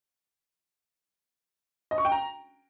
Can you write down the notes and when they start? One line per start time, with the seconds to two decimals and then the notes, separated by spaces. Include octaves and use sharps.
1.91 D#5
1.98 C#6
2.05 G5
2.12 A#5